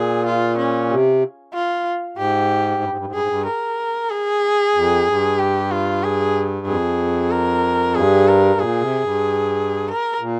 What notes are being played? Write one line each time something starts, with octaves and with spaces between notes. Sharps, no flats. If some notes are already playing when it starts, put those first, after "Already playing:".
Already playing: A#2 G#4
F4
C#4
C3
F4
G#2 G4
G2
G#2
G2
G#2
G2 G#4
G#2
G2
A#4
G#4
F2
G2
G4
F4
G#4
F2 G#4
A#4
G2 G#4
A#4
A#2 G#4
C3
G2
A#4
A#2